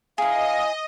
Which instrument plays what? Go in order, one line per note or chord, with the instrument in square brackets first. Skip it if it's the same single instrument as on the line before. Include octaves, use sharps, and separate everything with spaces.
[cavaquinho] E4 G#4 [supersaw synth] D#5 [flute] F5